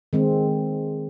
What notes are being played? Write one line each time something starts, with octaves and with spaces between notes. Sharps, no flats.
D#3 G#3 C4